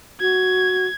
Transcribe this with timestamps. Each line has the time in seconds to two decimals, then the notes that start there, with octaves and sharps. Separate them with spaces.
0.21 F#4 G#6